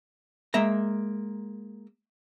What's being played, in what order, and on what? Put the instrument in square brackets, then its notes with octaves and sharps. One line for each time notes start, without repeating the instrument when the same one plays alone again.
[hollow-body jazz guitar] G#3 A#3 E5 A#5